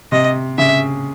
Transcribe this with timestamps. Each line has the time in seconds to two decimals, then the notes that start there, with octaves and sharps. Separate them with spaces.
0.12 C3 D#5
0.58 C#3 E5